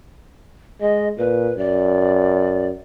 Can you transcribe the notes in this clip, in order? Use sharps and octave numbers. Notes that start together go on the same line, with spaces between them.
G#3 D#5
A#2 B4
F#2 D5